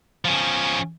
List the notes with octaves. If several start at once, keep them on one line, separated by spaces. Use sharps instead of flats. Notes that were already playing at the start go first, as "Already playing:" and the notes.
F3 C#4